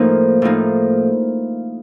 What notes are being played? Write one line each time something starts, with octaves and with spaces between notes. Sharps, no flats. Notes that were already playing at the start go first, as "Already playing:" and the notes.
Already playing: A2 F3 A#3 D#4 F5
A2 F3 A#3 D#4